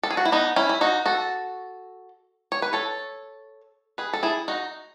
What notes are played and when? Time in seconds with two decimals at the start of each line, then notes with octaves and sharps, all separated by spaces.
0.03 A4
0.10 G#4
0.17 F#4
0.25 E4
0.32 B3 D#4
0.56 C#4 E4
0.69 E4
0.81 D#4 F#4
1.06 F#4 A4
2.52 C#5
2.62 B4
2.73 A4 C#5
3.98 G#4 B4
4.13 A4
4.23 E4 G#4
4.48 D#4 F#4